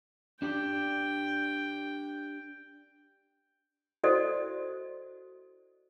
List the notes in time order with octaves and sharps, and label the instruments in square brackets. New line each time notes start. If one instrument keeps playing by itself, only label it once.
[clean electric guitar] D4 G4 D5 [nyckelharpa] G5
[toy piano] E4 F#4 A4 C5 D5 D#5